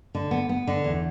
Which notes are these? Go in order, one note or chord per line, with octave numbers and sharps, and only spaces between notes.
D3
B3
B3
D3
E2